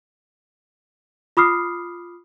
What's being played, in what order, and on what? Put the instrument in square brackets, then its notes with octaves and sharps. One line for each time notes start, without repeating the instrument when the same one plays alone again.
[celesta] F4 B5 D6 D#6 F6 C7